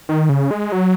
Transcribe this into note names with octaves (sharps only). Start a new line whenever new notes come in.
D#3
C#3
G#3
F#3